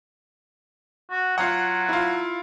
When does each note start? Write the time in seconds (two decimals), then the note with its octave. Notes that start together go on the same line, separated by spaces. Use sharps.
1.11 F#4
1.38 F#3 F4 F#5
1.89 E4 F4